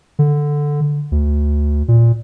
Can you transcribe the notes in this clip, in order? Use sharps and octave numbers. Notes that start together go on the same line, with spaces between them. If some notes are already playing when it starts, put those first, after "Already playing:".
D3
D2
A#2